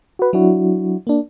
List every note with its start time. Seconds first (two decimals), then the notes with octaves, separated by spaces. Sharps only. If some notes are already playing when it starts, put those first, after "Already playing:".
0.19 F#4 B4
0.33 F#3 D4 E4 F#4
1.07 A#3 D4